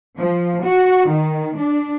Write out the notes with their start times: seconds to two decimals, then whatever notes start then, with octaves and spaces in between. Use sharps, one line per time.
0.17 F3
0.63 F#4
1.10 D#3
1.58 D4